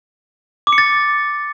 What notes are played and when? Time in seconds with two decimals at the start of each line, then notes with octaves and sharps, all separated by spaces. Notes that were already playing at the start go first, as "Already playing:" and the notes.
0.67 D6
0.72 C#7
0.78 A6